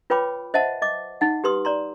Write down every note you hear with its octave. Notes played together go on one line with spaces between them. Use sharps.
F4 B4 C#5 G5 B5 D6
C5 D#5 E5 F#5 A5
D#5 D6
D#4 F#5
G4 B4 C6 D#6
D5 A#5 C6